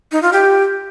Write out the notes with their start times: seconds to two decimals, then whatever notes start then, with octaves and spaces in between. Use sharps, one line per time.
0.12 D#4
0.22 F4
0.33 G4